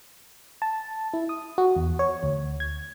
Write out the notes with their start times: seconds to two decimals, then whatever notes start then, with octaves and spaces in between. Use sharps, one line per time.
0.62 A5
1.13 E4
1.29 D#6
1.58 F#4
1.76 E2
1.99 C#5
2.23 D2
2.60 G#6